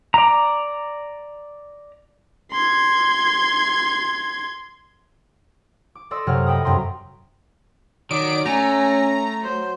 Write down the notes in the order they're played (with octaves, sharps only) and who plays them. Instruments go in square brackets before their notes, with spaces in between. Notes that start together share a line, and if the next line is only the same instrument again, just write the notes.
[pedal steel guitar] D5 A#5
[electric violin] C6 G#6
[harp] D6
A4 D5 D#5 C6 E6
F#2 C3 F#3 C#5 F#5 F6
D#5 E5 G5 B5 D#6 F6
F#2 C3 G5 A#5 C6
[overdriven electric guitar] D#3 [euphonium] F#3 [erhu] D5 [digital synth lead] D7
[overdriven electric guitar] A3 [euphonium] C#4 [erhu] G#5 [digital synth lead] A#5
[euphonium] F#3 [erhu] C5